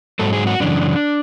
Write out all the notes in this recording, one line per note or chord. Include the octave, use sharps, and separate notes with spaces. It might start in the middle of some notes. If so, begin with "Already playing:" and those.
G#2 F#3 A4
G#4
F#4
F#2 C#3 E3 D4